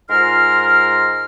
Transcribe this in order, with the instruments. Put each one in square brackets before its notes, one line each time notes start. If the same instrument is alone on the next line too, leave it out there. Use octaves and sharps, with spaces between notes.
[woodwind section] G#2 F4 A#4 C6 F6